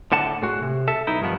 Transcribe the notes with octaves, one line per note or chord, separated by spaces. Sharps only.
A2 D3 F#5 A5
A2 G#3 F#4
C3
A4 E5 A5
B1 D#4 E4
G2 D#3 F3 B3